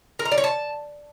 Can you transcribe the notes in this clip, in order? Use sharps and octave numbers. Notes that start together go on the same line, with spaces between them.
A#4
A#5
D5
C#5
A5